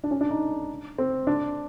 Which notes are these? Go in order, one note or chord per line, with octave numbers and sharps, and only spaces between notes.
D4
C#4
D4
D#4
C4
D4